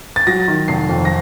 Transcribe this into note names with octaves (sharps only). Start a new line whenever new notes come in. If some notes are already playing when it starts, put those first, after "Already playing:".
A6
F#3 A#6
D#3
F1 C7
F2
A#6